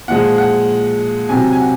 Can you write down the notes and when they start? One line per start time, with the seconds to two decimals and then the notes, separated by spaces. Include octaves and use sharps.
0.08 A#2 F3 G#3 F#5
0.38 F#5
1.29 C3 F#3 G#5
1.52 G#5
1.60 F#5